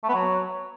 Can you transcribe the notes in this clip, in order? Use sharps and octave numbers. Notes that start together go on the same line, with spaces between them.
A3
B3
F#3